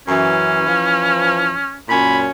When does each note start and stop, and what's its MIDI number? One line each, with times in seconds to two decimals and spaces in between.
0.08 0.63 42
0.08 0.63 52
0.08 1.76 61
0.67 1.59 52
0.67 1.59 53
1.89 2.30 42
1.89 2.30 46
1.89 2.30 61
1.89 2.19 83